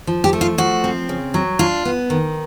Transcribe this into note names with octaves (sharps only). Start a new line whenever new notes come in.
F3
G4
A3
F4
F3 F#4
C4
C#3
F#3
D4 F4
B3
D#3